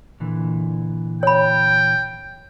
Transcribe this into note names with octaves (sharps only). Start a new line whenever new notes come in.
A#2 D3 E3
C#5 G5 B5